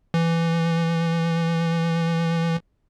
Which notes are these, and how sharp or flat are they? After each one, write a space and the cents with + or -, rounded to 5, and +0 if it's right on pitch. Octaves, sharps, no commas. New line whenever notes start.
E3 +15